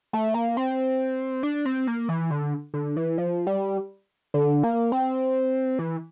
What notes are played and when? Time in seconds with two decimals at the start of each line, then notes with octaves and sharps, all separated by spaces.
0.13 A3
0.34 A#3
0.57 C4
1.43 D4
1.65 C4
1.87 A#3
2.09 E3
2.31 D3
2.74 D3
2.96 E3
3.18 F3
3.47 G3
4.34 D3
4.63 A#3
4.92 C4
5.79 E3